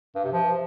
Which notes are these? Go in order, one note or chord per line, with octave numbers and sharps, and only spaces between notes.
G2
C3
F3